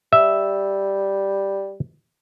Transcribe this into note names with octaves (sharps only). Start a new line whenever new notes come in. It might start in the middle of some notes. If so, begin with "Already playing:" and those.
G3 E5